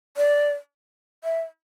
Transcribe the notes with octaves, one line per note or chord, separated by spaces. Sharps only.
D5
E5